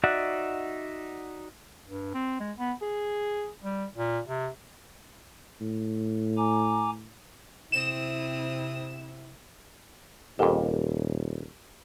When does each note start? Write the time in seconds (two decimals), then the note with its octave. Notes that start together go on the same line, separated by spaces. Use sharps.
0.04 D#4 F#4 D5 E5 F#5
1.86 G2
2.14 C4
2.40 G#3
2.58 B3
2.82 G#4
3.63 G3
3.96 A#2
4.28 C3
5.61 A2
6.37 G#5 A#5 D6
7.72 C3 C4 E4 D#6 E7
10.39 D#1 F2 G#2 G4 A4 A#4